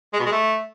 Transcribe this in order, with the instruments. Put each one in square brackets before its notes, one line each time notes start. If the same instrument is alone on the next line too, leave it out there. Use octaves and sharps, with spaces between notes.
[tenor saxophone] G#3
B2
G#3
A3